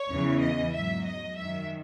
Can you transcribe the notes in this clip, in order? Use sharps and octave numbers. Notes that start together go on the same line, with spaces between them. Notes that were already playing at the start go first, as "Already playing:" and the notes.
Already playing: C#5
E2 C#3 E3
D#5
G#2 F#3 E5
D#5
F#2 D#3 F#3 E5